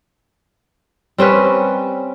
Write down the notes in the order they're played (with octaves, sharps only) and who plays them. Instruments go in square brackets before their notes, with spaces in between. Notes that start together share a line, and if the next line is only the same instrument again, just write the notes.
[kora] G3 C4 C#4 B4